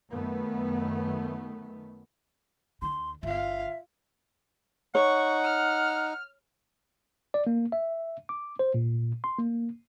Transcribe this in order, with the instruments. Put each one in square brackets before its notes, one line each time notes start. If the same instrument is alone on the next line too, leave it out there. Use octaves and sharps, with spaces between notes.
[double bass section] F#2 D#3 A3 B3
[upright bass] D2 D3 [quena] C6
[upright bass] G1 D3 [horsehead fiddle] F4 F5 [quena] E5
[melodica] D#4 [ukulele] C#5 [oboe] F#5 [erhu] C#6
[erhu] F6
[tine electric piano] D5
A#3
E5
D6
C5
A#2
C6
A#3